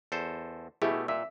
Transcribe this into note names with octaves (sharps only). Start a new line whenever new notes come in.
E2 A4 C5
B2 A3 E4 G4 G#4
A#2 E5